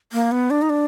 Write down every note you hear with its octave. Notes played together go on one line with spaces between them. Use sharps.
A#3
B3
D4
D#4
D4